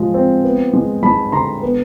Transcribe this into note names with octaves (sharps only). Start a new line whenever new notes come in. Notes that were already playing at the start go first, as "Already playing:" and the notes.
Already playing: F3 G#3
C4
B3
G#3
G#3 A5 B5
D3 A#5 C6
B3